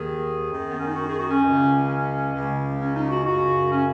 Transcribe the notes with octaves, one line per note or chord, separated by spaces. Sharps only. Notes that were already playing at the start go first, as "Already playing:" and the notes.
Already playing: D#2 D#3 G#4
F#2 D#3
B3
C#4
D#4
F#4
G#4
F#4
C#4
C#2 C#3
C#4
C#2 C#3
C#4
D#4
F#4
F#2 C#3 F#4
C#4